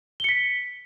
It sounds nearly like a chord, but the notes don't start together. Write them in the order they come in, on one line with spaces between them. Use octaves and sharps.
G7 C#7 B6